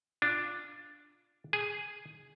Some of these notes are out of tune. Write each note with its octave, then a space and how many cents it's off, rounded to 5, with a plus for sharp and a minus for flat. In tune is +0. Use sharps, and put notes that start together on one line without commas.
D4 +0 F4 +0
G#4 +0 G#5 -5